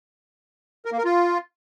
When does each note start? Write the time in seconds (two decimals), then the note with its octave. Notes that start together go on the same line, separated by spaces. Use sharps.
0.85 A#4
0.92 A#3
0.98 A#4
1.05 F4